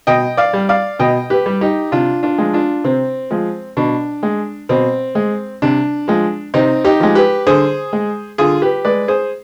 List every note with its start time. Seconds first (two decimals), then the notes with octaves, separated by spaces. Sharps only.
0.07 B2 D#5 G5
0.37 D5 F5
0.53 G3
0.69 D5 F5
0.99 B2 D#5 G5
1.30 G4 B4
1.46 G3
1.61 D#4 G4
1.92 C3 D4 F4
2.23 D4 F4
2.38 F3 G#3
2.53 D4 F4
2.84 C3 C4
3.31 F3 G#3
3.77 B2 D4
4.23 G#3
4.69 B2 C4
5.15 G#3
5.62 C3 D4
6.08 F3 G#3
6.54 C3 C4 D#4
6.84 D#4 G4
7.00 F3 G#3
7.15 G4 B4
7.47 D3 G#4 C5
7.93 G#3
8.38 D3 F4 G#4
8.62 G4 B4
8.85 G#3 B4 D5
9.08 G#4 C5